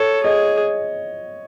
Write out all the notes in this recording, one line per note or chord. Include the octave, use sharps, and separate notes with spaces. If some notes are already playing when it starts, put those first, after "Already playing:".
Already playing: A4 C#5
G#4 D#5